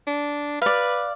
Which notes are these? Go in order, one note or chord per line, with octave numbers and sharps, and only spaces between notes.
D4
B4 D5 F5